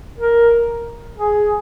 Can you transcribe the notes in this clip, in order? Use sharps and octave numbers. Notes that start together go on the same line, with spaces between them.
A#4
G#4